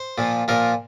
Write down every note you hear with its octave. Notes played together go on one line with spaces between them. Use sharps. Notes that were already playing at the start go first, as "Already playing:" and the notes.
Already playing: C5
A#2 F3
A#2 F3 A#4